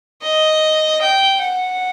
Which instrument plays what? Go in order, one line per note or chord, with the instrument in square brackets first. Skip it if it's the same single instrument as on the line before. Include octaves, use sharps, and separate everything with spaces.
[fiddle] D#5
G5
F#5